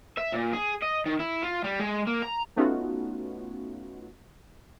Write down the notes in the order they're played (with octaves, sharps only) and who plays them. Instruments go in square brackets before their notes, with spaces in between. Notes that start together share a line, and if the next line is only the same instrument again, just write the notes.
[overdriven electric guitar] E5
A#2
G#4
D#5
D#3
E4
F4
G3
G#3
A#3
A#5
[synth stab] A3 B3 C#4 D#4 F4 F#4